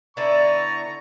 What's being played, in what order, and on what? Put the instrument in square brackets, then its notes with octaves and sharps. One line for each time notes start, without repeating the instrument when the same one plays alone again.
[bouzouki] D3 B3 E4 [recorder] D5 [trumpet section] A#5 C#6